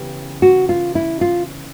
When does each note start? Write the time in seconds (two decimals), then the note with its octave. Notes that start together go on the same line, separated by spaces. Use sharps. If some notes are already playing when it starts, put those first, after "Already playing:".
Already playing: C#3 E3 B3 G4
0.42 F#4
0.69 F4
0.95 E4
1.21 F4